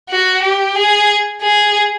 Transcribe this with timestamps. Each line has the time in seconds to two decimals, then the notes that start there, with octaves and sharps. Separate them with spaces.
0.10 F#4
0.42 G4
0.75 G#4
1.41 G#4